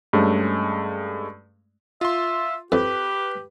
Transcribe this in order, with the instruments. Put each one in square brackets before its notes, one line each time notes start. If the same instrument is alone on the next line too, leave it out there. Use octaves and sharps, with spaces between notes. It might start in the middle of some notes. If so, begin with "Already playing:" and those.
[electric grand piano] G2 G#3 A3 C#4
[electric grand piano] F4 C6 [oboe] E5
[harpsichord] F2 [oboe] G4 [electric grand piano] B4